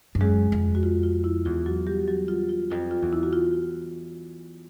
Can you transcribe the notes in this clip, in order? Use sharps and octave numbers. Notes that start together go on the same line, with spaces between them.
G2
F#2 G#3 G#4
F2
F#4
F4
F4
E4
E2 F4
F#3 F#4
G3 G4
F#3 F#4
F4
F4
F2 F4
F4
E2
E4
F#4
F4